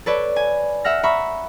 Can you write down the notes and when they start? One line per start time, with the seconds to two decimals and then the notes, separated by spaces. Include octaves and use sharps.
0.06 A4 B4 C#5 D5
0.36 G#5
0.84 E5 F#5 F6 A#6
1.04 E5 A#5 B5 C#6